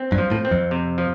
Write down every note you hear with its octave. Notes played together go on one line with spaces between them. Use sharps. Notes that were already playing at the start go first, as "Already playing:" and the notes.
Already playing: C4
G2
F3
A2
C4
F2
C3
F3